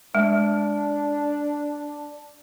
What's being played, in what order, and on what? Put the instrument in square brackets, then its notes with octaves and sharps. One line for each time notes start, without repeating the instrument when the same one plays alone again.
[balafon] G#3 [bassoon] D4